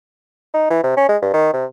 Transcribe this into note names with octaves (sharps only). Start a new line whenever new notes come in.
D#4
E3
C3
C#4
G#3
G2
D#3
C3